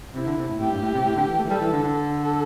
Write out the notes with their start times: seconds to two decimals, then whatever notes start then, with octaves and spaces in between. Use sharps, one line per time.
0.14 C3 E4
0.26 D3
0.37 C3
0.48 A2
0.60 A2 G4
0.71 G2
0.82 A2
0.94 C3
1.05 A2
1.16 D3
1.27 E3
1.39 A3
1.45 E3
1.50 G3 A4
1.61 E3
1.72 D3
1.84 D3
1.95 A4